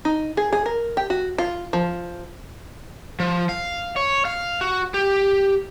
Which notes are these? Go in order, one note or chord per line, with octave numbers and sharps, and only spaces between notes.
D#4
G#4
G#4
A#4
G4
F#4
F4
F3
F3
F5
C#5
F5
F#4
G4